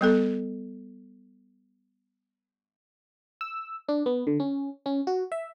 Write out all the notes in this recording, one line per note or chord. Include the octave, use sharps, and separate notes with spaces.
G3 B3 A4
E6
D4
B3
D3
C#4
C#4
F#4
E5